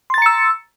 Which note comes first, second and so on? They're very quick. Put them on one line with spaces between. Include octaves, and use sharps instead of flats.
C6 A6 A#5 C#7 E6